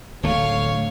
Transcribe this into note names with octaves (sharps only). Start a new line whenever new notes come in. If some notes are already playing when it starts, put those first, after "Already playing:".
D1 D2 A3 C#5 F5